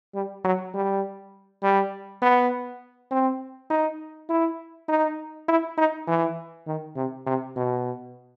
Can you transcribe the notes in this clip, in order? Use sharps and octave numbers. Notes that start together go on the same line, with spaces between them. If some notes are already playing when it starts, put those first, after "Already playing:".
G3
F#3
G3
G3
B3
C4
D#4
E4
D#4
E4
D#4
E3
D#3
C3
C3
B2